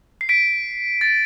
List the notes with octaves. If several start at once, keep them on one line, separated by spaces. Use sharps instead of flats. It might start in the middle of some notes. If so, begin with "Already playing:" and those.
C7
B6 D7
A6